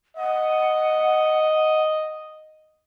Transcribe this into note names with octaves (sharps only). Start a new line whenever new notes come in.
D#5 F#5